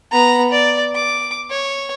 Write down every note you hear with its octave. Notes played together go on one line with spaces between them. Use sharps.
B3 A#5
D5
D6
C#5